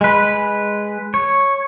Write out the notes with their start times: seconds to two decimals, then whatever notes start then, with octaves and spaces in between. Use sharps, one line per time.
0.01 G#3 B4
1.14 C#5